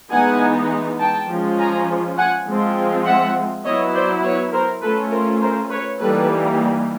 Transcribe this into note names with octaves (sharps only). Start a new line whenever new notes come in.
E3 G#3 B3 D#4 F#5 G#5
G5 A5
F3 G#3 C#4 F4
G#5 A#5
F#5 G#5
F3 G#3 C4 F4
E5 F#5
F#3 B3 E4 C#5 D#5
C5 D5
B4 C#5
A#4 C5
A3 C#4 F4 A4 B4
A#4 C5
A#4 C5
B4 C#5
E3 G3 A#3 D#4 A4 B4